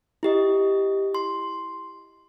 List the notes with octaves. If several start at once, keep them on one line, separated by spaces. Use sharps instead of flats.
E4 G4 D#5
C6